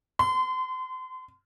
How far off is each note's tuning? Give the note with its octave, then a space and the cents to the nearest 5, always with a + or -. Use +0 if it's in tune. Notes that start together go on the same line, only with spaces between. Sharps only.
C6 -30